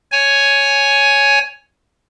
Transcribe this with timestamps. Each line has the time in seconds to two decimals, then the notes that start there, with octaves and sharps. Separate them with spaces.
0.12 C#5 G#5